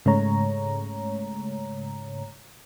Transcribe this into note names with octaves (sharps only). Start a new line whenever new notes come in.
G#2 C#3 G#3 A3 C#5 A#5